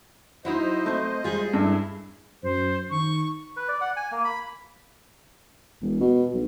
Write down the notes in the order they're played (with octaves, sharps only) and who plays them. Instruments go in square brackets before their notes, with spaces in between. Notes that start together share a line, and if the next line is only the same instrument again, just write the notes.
[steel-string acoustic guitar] F#3 [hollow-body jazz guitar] D#4 E4 F#4 [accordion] C5 D#5
[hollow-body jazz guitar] A3 C4
[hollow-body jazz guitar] G3 F4 [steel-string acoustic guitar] G#3 G#4
[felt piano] G2 [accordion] E4 [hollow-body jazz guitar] A4
[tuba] F#2 [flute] C5
[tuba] D#3 [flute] C#6
[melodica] B4
D5
F#5
G#5
A#3
B5
[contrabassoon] E1
B2
B1